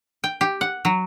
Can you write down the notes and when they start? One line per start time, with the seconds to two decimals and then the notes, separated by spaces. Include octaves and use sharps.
0.24 G5
0.41 G4
0.61 F#5
0.85 F#3